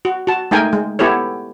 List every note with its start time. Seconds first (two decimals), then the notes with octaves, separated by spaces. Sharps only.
0.05 F#4
0.27 F#4 A5
0.51 G#3 A3 D#4 A#4 G5 G#5
0.73 G#3
0.99 B3 E4 G4 A4 C#5